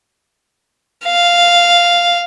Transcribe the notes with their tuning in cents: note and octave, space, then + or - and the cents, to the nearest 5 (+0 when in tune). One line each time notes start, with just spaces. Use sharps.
F5 -5